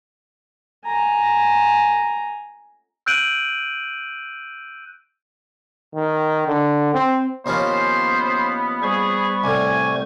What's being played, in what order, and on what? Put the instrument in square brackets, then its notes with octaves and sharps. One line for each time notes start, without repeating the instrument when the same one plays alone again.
[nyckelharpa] G#5 A#5
[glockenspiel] E6 F#6 G6 D7 D#7 F#7
[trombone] D#3
D3
C4
[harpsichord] D#2 F3 C#4 [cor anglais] B3 [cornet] C5
[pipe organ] G3 C5 C#6 [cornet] G#4
[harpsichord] C2 A2 [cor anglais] D5 [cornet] G#5